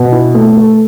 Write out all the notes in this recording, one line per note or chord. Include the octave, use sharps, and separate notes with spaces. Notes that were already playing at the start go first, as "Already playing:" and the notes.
Already playing: B2
E4
A3
A4